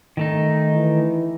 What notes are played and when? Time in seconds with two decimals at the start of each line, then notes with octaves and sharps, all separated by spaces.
0.17 D#3 A3 D#4
0.75 E3